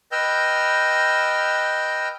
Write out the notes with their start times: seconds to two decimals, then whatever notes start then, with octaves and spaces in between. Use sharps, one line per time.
0.12 B4 D#5 G5 E6 F6 G6